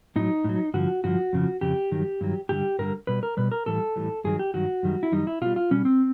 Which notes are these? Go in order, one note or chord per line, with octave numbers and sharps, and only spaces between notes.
A2 F#3 D#4
A2 F#3
G2 D3 F3 F#4
G2 D3 F3 F#4
F2 C#3 F3
F2 C#3 G4
G2 D#3 F#3
G2 D#3 F#3
G2 D3 G3 G4
G2 D3 G3 A#4
B2 G3 B4
A#4
B2 G3 B4
A#4
A2 E3 G3 A4
A2 E3 G3
G2 D#3 F#3 G#4
G4
G2 D#3 F#3 F#4
F#2 D#3 G3
E4
F#2 D#3 G3 D#4
E4
B2 G3 F4
F4
B2 G3 C#4
C4